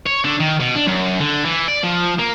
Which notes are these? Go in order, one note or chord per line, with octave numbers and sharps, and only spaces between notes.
C#5
D3
D#3
B2
D4
F#2
D3
E3
D5
F3
A#3